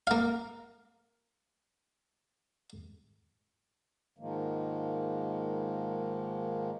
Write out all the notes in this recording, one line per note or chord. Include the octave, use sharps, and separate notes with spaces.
A#3 F5
G#2 D#3 F3 G#3 A#3